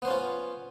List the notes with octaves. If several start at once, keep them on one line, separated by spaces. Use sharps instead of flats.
B3 C#4 F4 C5